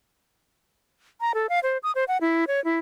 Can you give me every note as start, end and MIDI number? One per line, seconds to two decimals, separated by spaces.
1.21 1.32 82
1.34 1.47 69
1.49 1.59 77
1.63 1.78 72
1.83 1.92 87
1.95 2.04 72
2.08 2.17 78
2.21 2.45 64
2.47 2.63 73
2.65 2.79 64